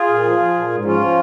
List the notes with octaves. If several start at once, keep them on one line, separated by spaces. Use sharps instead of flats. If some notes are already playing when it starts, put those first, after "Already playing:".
Already playing: F4 G#4
A#2
F3
F3
A#2
G#2
F3 C#4 F4
F3